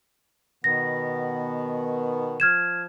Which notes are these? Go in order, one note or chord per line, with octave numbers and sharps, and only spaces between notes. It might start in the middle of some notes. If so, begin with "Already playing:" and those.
B2 D#3 B3 A#6
F3 F6 G#6 E7